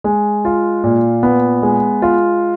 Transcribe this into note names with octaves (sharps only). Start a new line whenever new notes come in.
G#3
F4
A#2
B3
G#3
F4